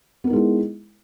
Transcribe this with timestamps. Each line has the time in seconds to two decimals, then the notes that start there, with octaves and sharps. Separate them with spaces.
0.24 B3
0.27 A#4
0.30 D#4
0.33 G#3
0.36 E4